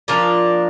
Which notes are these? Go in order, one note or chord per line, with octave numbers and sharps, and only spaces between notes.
F3 A#3 D4 F4 D5